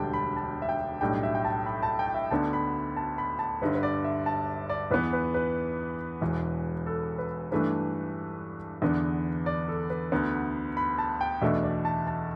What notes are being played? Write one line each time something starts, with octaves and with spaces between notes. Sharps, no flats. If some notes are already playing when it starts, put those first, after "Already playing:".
Already playing: E1 D2 D3 G3 D4 G5 A5
B5
A5
E5
G5
B1 A2 G3 D4 G5
E5
G5
A5
B5
A5
G5
E5
D2 D3 B3 D4 A5
B5
A5
B5
A5
G1 G2 D3 B4
B4
D5
E5
A5
D5
E2 E3 B3 B4
B4
B4
E1 E2 E3
A4
B4
G2 E3 A3 D4 B4
E2 D3 B3 D4
D5
A4
B4
D2 D3 B3
B5
A5
G5
E2 B2 A3 D4 E5
D5
A5
A5